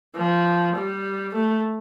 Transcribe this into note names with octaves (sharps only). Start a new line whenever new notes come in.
F3
G3
A3